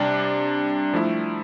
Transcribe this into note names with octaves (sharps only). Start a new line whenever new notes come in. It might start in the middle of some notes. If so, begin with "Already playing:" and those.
Already playing: C3 G3 D4
F3 A3 E4